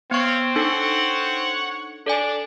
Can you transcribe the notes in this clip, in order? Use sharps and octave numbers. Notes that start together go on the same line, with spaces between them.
B3 C4 C#5 F5 C#6
D4 D#4 A4 C#5 F#5 C#6
D4 A4 D5 G#5